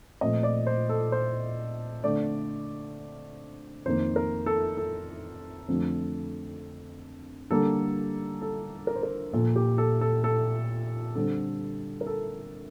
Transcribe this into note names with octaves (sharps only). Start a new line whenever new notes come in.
A#2 F3 A3 C4 D#5
D5
C5
A4
C5
D3 A3 C4 D5
F2 D#3 A#3 C5
A#4
A4
A4
F2 D3 F3 A3 C4
D3 G3 A#3 A4
A4
A#4
C5
A#4
A#2 F3 A#3 A4
G4
A4
A4
A4
D3 G3 C4 A4
A#4
A4